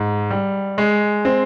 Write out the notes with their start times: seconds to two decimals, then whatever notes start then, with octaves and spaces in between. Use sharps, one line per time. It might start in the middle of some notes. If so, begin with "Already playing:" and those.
Already playing: G#2
0.31 G3
0.78 G#3
1.25 C4